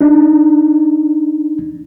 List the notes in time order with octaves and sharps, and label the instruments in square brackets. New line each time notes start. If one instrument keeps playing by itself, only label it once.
[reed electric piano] D4 D#4